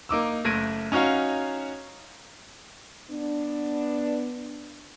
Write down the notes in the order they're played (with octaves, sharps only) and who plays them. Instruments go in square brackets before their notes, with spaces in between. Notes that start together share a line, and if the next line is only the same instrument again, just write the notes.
[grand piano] A#3 D#4 D6 E6
F#1 A3 G#6 A#6 D7 D#7
C#4 D#4 F#4 C#5 F5
[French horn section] B3 D4